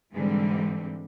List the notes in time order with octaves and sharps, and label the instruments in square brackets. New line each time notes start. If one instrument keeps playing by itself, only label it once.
[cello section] G#2 D3 E3 G3 G#3 C4